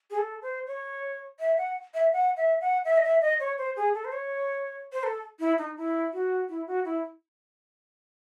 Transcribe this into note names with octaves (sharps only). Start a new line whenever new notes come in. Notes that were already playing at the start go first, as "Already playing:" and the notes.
G#4
A4
C5
C#5
E5
F#5
E5
F#5
E5
F#5
E5
D#5
E5
D#5
C#5
C5
G#4
A4
C5
C#5
C5
A4
E4
D#4
E4
F#4
E4
F#4
E4